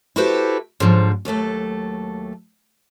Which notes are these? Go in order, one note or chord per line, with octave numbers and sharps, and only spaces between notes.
E4 F#4 G4 A4 B4 C5
G#2 D3 F3 F#3
D#2 F#3 A3 A4